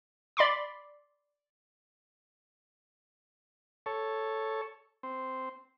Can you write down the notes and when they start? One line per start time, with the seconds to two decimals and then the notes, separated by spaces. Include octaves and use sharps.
0.37 D5 B5 C6 D6
3.86 A4 C#5
5.03 C4